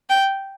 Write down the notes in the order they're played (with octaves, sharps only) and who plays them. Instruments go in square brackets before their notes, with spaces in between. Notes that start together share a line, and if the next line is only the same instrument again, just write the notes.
[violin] G5